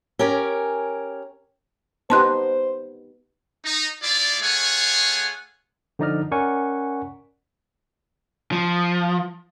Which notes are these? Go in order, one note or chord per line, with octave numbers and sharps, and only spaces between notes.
C#4 G4 A#4 G#5
B3 D#4 G4 C5 A5 C6 F#6
D#4
G#3 E4 F4 D5
A3 F4 G#4 C#5 F#5 G#5
D3 F3 D#4 D5 D#5 F6
C#4 A#4 D5 F#5 G#5 C#6
F3